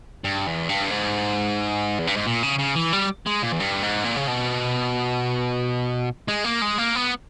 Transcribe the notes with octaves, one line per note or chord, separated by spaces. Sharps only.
G2
E2
G2
G#2
E2
G2
G#2
A#2
C#3
C#3
E3
G3
G#3
A#2
E2
G2
G#2
A#2
C#3
B2
G#3
A#3
G#3
A#3
B3